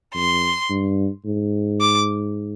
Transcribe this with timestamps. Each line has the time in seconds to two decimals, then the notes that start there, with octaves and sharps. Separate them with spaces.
0.15 F2 C6
0.70 G2
1.25 G#2
1.81 D6